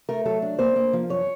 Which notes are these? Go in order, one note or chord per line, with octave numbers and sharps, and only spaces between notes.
A3 A#4
F#3 A4
D4
A#3 C5
A#3
F3
F#2 C#5